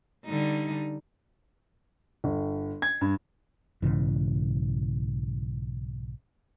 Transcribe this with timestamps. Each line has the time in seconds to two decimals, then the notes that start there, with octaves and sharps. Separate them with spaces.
0.25 D3 G3 D#4
2.24 G1
2.82 G#6
3.01 G2
3.82 B1 G#2 C#3 E3